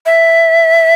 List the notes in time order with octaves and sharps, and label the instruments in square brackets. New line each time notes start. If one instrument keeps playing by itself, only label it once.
[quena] E5